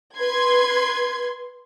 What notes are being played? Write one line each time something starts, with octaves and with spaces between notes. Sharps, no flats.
B4 C6 G#6